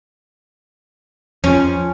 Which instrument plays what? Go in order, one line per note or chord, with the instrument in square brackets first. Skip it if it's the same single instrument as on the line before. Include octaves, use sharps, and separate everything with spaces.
[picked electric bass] F2 F3 [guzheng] C#4